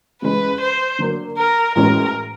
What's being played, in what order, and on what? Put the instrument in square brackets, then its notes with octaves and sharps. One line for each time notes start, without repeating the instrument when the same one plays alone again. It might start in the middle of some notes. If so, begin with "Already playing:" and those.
[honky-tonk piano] C#3 E3 G#3 [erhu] B4
[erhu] C5
[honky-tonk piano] D3 F#3 A#3
[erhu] A#4
[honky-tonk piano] A2 E3 G#3 C#4 F#4 [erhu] A#4